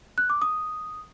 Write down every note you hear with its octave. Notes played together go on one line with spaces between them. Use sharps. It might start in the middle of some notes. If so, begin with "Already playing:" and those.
F#6
D6
D#6